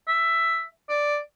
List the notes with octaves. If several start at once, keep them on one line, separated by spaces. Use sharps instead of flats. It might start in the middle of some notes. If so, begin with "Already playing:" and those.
E5
D5